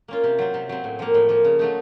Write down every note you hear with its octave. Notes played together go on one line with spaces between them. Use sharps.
A#3 C#4 F4
C3
F#3 C4
C3
F#3 C4
A2
F3 A#3
A2
F3 A#3
C#3
F#3 A3 D#4